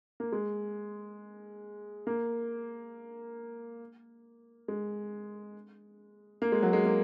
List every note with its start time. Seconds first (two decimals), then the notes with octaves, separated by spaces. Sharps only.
0.20 A#3
0.32 G#3
2.07 A#3
4.68 G#3
6.42 A#3
6.52 G#3
6.63 F#3
6.73 G#3
6.85 A#3